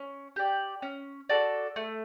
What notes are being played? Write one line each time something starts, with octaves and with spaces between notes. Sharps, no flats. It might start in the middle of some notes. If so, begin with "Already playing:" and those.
Already playing: C#4
G4 D5
C#4
F#4 A4 D5
A3